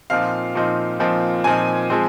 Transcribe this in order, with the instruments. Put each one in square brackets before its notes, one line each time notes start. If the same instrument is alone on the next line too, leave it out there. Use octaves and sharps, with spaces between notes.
[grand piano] A#2 F3 C4 D#4 F5
A#2 F3 C4 D#4
A#2 F3 C4 D#4
A#2 F3 C4 D#4 G#5
F3 G#3 C4